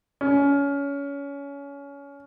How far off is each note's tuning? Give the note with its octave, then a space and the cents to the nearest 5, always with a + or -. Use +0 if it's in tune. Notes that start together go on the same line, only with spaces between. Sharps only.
C#4 +25